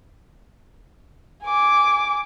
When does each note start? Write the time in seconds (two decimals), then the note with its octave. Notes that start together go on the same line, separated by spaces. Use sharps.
1.44 G#5 D6